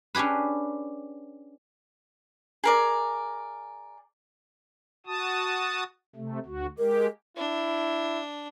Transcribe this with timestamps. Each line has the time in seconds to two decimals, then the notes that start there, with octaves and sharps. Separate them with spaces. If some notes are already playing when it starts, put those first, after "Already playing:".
0.15 C#4 D4 G4 G#4 B4
2.64 G#4 A#4 D5
5.06 F#4 A5 D#6
6.16 C3 A3
6.46 D2 F#4
6.78 G#3 G4 A#4
7.37 D4 E4